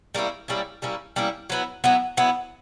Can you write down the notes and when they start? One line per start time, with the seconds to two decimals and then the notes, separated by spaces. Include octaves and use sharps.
0.15 G3 A#3 C#4 E4
0.48 G3 A#3 C#4 E4
0.82 G3 A#3 C#4 E4
1.16 G3 A#3 C#4 E4
1.50 F#3 B3 E4
1.84 F#3 B3 E4
2.17 F#3 B3 E4